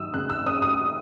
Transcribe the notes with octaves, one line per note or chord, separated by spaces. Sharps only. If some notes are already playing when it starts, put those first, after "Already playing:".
Already playing: D#2 F#3 D#6 E6
C#3 F#6
E6
C#4 D#6
D#6